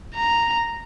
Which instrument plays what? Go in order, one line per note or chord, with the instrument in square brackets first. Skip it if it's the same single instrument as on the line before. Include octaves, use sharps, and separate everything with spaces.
[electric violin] A#5